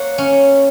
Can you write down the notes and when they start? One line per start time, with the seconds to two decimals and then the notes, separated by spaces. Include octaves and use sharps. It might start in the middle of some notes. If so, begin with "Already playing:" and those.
Already playing: A#3 C#5 F#5
0.18 C#4